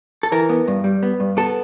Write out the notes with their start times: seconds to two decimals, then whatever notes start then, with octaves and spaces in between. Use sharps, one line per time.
0.23 A4
0.32 E3 A#4
0.50 B3
0.68 G2
0.84 G3
1.03 B3
1.20 G2
1.37 B3 A4